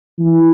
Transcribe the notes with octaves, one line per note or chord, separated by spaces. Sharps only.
E3